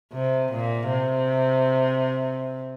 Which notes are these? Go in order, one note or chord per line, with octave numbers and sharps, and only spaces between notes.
C3
A#2
C3